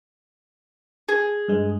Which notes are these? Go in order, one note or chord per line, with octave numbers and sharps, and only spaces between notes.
G#4
G2 G#3